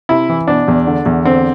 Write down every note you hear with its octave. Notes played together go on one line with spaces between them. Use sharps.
C3 E4
E3
B2 D4
E2
D3
E2
D3 C4